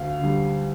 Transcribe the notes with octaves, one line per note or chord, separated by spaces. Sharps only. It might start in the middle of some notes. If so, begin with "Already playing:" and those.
Already playing: D2 F5
D3 G3